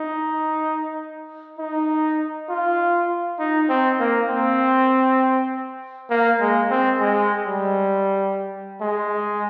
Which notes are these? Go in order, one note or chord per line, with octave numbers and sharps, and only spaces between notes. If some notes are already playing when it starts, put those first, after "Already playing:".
Already playing: D#4
D#4
F4
D#4
C4
A#3
C4
A#3
G#3
C4
G#3
G3
G#3